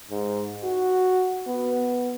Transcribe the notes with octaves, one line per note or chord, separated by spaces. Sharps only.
G#2
F#4
B3